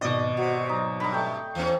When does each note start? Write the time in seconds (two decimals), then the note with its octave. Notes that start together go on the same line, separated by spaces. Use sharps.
0.01 G#1 G#2 B2 D5 D#5
0.37 C3 F#4
0.69 F#3 D#4
1.00 G2 A#5 B5
1.13 A3 G5
1.55 E2 E3 C#4